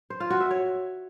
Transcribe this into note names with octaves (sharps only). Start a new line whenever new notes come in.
C5
F4
F#4
E5
C#5